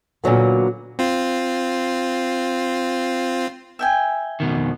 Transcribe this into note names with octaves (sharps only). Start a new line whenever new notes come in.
A#2 D3 F#3 B3
C4 F4
E5 G5 G#5
F2 B2 D#3